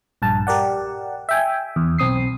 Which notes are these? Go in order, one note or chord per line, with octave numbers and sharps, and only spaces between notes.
A#1 G2 A5
G4 A#4 D5 F#5
E5 G5 G#5
E2
B1 C4 D#6 C7